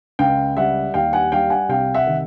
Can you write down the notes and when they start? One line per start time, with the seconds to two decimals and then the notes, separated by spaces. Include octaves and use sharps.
0.19 C#2 F5 G5
0.57 G3 E5 F#5
0.94 D#2 F5 G5
1.13 F#5 G#5
1.32 G3 F5 G5
1.50 F#5 G#5
1.69 C2 F5 G5
1.94 E5 F#5
2.07 D#3